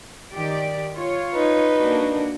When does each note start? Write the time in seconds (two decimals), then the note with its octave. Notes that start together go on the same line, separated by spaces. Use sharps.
0.33 D#3 G4 D5
0.95 F4 C#5
1.33 D#4 B4
1.76 A#3 D4 F#4